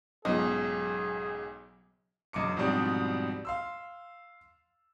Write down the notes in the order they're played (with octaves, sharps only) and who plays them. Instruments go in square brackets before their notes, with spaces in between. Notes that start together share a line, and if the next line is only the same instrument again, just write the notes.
[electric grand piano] B1 G#2 C#3 [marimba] F#3 B3 F4 [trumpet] G#4 [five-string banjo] D#5
[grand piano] E1 F#2 D#5 D6 C#7
G#2 B2 F3 G3 C4 D4
F5 C6 E6